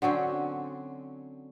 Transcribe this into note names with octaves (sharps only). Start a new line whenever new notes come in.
D3 F#3 C4 C#4